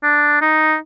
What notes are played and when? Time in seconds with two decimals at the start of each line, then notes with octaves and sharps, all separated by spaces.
0.03 D4
0.42 D#4